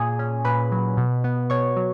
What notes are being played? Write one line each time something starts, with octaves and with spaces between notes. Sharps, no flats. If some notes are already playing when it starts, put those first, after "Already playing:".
Already playing: A#2 G#4 G#5
C#4
A#2 B4 B5
F#3
B2
B3
B2 C#5 C#6
F#3